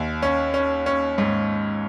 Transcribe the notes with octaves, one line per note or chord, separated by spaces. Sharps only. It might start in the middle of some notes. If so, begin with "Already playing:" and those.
Already playing: D#2
C#4
C#4
C#4
G#2